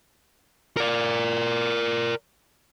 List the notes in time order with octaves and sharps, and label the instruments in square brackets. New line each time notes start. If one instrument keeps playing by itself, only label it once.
[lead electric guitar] A#4 D5